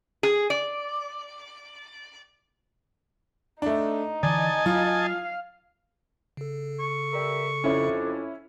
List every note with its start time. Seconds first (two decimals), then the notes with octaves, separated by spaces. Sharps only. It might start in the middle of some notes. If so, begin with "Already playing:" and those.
0.23 G#4
0.50 D5
3.62 A3 D4 D#4
4.23 D3 E3 D5 D#5 G#5 A5
4.66 F#3 F4
4.99 F5
6.37 C#3 A4
6.80 C#6
7.13 G3 A#4 E5
7.64 F2 C#4 D4 E4